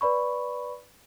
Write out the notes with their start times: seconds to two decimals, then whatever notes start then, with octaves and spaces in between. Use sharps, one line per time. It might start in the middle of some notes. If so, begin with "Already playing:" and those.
0.01 B4 D5 B5 C#6